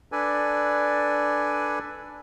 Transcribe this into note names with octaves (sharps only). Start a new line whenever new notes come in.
D4 A4 B4 D5 G#5